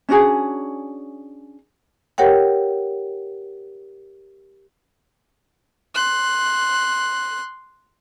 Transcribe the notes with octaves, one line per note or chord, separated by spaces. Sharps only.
C#4 D4 F#4 G#4
G4 A#4 C#5 F#5 G5
C6 F#6